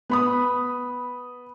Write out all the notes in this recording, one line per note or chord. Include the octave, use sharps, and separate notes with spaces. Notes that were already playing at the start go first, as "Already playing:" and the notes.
B3 B5 D#6